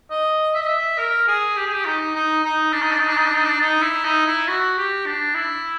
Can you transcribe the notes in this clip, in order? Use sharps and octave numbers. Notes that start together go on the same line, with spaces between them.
D#5
E5
D#5
E5
A#4
G#4
G4
G#4
G4
D#4
D#4
D#4
D4
D#4
D4
D#4
D4
D#4
D4
D#4
D4
D#4
E4
D#4
E4
F#4
G4
D4
E4